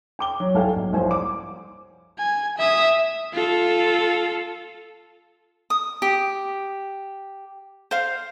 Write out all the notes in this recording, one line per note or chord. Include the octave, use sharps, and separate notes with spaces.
G5 D6 G7
F#3
C2 A4 F5 G5 G#5
B1
C2 F3 C5 C#5 G#5
D6
G#5
E5 D#6
F4 A4
D#6
G4
C5 F5